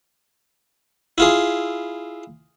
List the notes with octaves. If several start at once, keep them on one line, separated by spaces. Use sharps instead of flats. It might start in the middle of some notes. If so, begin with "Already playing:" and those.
E4 F4 G#4